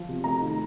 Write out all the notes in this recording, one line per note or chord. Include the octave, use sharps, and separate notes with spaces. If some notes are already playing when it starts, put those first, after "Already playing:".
Already playing: F3
C3
A3 A#5
D#3